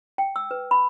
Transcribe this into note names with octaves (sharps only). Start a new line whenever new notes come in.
G5
E6
B4
B5